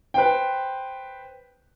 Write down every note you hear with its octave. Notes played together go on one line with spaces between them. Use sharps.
B4 C5 G5